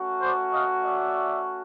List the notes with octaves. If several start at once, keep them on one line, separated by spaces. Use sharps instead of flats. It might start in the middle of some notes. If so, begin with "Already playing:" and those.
Already playing: A3 C#4 F#4
C5 D5
D#5 F5
D5 E5